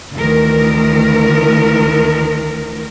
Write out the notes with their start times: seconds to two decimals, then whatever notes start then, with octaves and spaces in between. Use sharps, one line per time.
0.14 D2 D#3 E3 A#4